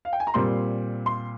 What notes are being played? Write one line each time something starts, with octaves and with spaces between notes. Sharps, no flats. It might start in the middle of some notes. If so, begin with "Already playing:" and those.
F5
G5
G#5
A#5
A#2 G3 C4 C6
C6